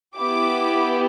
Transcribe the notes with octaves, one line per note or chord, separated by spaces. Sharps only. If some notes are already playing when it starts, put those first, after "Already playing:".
B3 E4 G4 D6